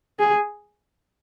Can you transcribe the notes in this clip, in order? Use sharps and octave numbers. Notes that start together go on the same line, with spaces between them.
G#4